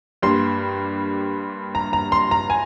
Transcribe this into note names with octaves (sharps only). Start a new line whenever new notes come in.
G2 G3 A#3 C6
A#5
A#5
C6
A#5
G#5